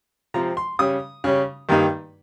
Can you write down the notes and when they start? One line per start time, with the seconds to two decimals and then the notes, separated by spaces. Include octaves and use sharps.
0.34 C3 F3 C4 A#5
0.57 C6
0.79 C#3 G3 C#4 D#6
1.24 C#3 G3 C#4
1.69 G2 D#3 G3 A#3 D#4